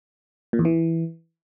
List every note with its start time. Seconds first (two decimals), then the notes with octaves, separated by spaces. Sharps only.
0.53 A#2
0.59 E2
0.65 E3